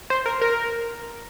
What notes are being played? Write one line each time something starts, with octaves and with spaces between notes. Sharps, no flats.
C5
A#4
A#4